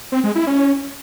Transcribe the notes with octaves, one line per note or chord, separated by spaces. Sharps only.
C4
G#3
E4
C#4